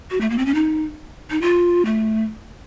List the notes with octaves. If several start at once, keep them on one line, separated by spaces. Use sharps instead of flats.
F#4
A3
A#3
C4
C#4
D#4
D#4
F4
A3